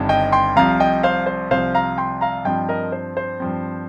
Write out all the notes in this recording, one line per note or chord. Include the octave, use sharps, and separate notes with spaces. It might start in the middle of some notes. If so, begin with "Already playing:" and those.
Already playing: G1 G2 D#3 C4
D#5 G5
G5 C6
C2 C3 F3 F5 A#5
D#5 G5
C5 F5
C5
C2 C3 F3 C5 F5
F5 A#5
G5 C6
F5 A#5
G2 F3 C4 D#5 G5
A#4 D#5
C5
C5
G2 F3 C4